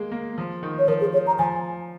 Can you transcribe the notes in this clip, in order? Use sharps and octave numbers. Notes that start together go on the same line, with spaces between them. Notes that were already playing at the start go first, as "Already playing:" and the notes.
Already playing: G#3 A#3
A#3
F3
D#3
C#5
F3 A#4
G#4
C#5
A#5
F3 G#5